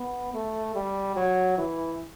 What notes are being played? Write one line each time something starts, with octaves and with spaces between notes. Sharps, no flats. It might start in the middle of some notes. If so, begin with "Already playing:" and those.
Already playing: B3
A3
G3
F#3
E3